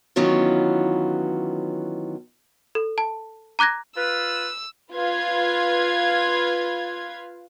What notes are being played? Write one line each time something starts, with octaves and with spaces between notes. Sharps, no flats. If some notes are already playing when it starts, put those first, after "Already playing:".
D#3 E3 F#3 B3 C#4 F4
A4
A5
A#5 D6 F#6 G#6 A#6
F4 B4 E6
F4 B4 F5 G#6